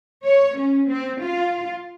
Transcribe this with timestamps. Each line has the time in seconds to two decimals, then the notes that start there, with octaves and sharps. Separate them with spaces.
0.24 C#5
0.57 C#4
0.90 C4
1.23 F4